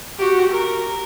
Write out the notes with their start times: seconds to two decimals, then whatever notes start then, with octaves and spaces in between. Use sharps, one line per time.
0.18 F#4 G4
0.51 A#4